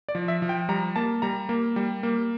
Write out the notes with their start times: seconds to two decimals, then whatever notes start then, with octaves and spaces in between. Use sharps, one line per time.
0.09 D5
0.15 F3
0.28 E5
0.42 F3
0.49 G5
0.69 G3 A#5
0.96 A#3 A5
1.22 G3 A#5
1.49 A#3
1.76 G3
2.03 A#3